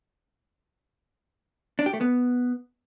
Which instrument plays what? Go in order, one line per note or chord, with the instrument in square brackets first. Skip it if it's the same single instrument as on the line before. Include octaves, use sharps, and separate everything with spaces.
[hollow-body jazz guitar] D4
G4
A3
B3